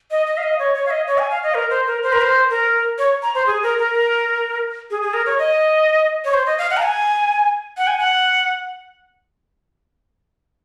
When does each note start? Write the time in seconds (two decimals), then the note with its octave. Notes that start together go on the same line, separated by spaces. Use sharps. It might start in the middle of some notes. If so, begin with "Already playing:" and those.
0.11 D#5
0.27 D#5
0.38 F5
0.43 D#5
0.59 C#5
0.75 C#5
0.86 F5
0.91 D#5
1.07 C#5
1.18 G#5
1.31 F5
1.43 D#5
1.54 A#4
1.70 C5
1.86 A#4
2.03 C5
2.13 A#4
2.21 C5
2.50 A#4
2.98 C#5
3.22 A#5
3.35 C5
3.47 G#4
3.63 A#4
3.78 A#4
4.91 G#4
5.02 G#4
5.14 A#4
5.26 C#5
5.39 D#5
6.25 C#5
6.34 C5
6.46 D#5
6.58 F5
6.70 F#5
6.77 A#5
6.82 G#5
7.77 F#5
7.87 G#5
7.98 F#5